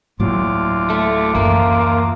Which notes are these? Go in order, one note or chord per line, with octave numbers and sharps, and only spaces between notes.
D2 A2 F#3 A#3 F4 D6
A3
F#2 E3 A#3